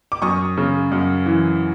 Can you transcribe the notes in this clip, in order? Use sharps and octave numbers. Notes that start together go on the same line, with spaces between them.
D6
F#2 C#6 D#6
C#3
F#2
E3